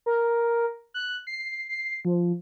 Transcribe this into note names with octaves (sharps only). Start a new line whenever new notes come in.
A#4
F#6
C7
C7
F3